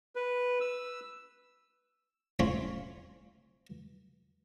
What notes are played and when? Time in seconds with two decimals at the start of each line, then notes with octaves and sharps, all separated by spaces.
0.15 B4
0.61 E6
2.39 A3 C4 C#4 F4 C#5 B5